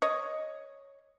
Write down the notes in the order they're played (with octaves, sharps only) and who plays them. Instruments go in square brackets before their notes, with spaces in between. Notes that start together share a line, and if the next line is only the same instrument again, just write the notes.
[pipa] C#5 D#5